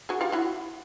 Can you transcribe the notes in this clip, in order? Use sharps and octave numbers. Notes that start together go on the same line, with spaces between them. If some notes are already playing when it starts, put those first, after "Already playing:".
F#4 G#4
F4 G4
E4 F#4